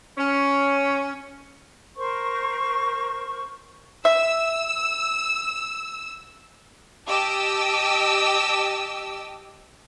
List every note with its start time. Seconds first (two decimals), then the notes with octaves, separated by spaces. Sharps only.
0.18 C#4
1.96 A#4 C5 C#6
4.05 E5 E6
7.08 G4 D#5 A5 D6 E6